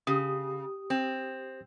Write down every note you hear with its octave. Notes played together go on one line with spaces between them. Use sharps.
C#3 G4 D#6
C4